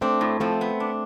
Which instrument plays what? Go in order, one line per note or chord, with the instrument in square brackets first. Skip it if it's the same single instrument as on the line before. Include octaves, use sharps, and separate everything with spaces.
[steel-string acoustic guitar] A3 C4 [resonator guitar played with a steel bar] D4
[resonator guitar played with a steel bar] A2
[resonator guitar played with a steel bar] F3 [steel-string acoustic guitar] A3 C4
[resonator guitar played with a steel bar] B3
D4